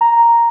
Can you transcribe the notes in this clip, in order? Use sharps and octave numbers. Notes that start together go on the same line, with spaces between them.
A#5